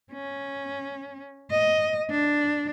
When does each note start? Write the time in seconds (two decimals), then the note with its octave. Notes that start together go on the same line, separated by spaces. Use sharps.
0.13 C#4
1.51 D#5
2.10 D4